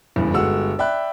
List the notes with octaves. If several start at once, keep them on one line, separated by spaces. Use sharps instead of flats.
F#1 E2 G2
G1 G#3 F#4 F#5 E6
D5 E5 G5 B5 F#6